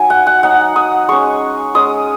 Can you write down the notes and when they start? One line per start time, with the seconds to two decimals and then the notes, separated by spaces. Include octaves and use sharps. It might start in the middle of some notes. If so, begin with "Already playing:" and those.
Already playing: F#3 D#4 G#5
0.10 F#5
0.27 F#5
0.43 F#3 D#4 F#5
0.76 D#6
1.09 G#3 C#4 C#6
1.75 G#3 C#4 D#6